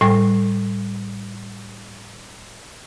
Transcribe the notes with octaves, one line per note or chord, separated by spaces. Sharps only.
A2 G3